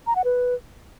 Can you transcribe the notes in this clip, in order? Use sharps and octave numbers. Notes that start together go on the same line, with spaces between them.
A#5
F#5
B4